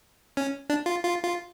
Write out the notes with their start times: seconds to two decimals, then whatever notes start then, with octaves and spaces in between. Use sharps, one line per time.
0.37 C#4
0.70 D4
0.86 F4
1.05 F4
1.24 F4